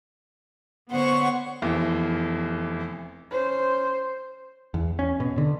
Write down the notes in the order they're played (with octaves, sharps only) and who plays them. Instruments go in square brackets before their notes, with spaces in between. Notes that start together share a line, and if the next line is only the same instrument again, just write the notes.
[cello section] D3 B3 C#5 [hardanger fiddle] C5 C#6 [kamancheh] F#5
[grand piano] F1 E2
[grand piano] C#4 [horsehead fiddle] C5
[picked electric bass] E2
C#4
B2
D3